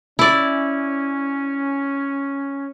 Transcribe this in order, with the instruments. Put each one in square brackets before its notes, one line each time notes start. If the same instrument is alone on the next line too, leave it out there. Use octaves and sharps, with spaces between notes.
[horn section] C#4 [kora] E4 D5